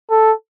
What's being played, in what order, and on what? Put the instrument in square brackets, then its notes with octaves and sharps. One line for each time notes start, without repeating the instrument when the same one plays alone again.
[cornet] A4